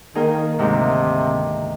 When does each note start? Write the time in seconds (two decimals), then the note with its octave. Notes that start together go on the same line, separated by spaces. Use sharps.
0.15 D#3 A#3 D#4 G#4
0.59 D2 G#2 C3 D#3